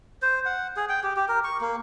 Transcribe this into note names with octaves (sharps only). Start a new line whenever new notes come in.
C5
F#5
G#4
G5
G4
G4
A#4
C#6
A#3